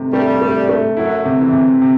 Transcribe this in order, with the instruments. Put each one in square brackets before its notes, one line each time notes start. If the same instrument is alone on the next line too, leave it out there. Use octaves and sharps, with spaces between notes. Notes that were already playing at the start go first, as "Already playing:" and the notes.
Already playing: [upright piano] C3 D#3 A3
[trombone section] G2 G3 [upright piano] A3
[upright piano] A3
A3
[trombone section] F#2 F#3 [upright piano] E4
[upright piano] C3
[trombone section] E2 E3
[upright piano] C3
C3